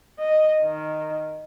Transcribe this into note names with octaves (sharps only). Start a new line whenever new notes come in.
D#5
D#3